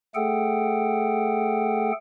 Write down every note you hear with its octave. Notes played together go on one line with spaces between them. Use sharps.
A3 G#4 A4 F#5 G5